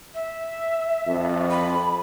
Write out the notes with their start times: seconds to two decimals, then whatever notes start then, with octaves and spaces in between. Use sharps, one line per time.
0.14 E5
1.07 F2
1.50 B5